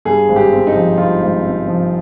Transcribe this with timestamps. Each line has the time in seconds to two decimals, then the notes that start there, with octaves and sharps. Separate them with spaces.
0.05 G2 G#4
0.28 G#1
0.36 G4
0.52 C4
0.67 D#4
0.75 F3
0.98 G2 F4
1.21 G#1
1.44 C4
1.67 F3